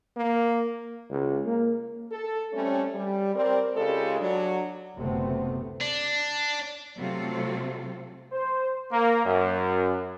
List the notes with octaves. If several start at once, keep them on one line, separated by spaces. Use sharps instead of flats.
A#3
C#2
A#3
A4
G3 A3 C4 C#4
G3
C4 A#4 D5
C#3 G#3 F4 G4 A4
F#3 D4
F#1 D2 C3 A3 B3 C4
D4
C3 F#3 A3 C4 F4 A4
C5
A#3
F#2